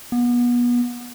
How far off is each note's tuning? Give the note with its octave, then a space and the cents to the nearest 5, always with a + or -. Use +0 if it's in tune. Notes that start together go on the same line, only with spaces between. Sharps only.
B3 -30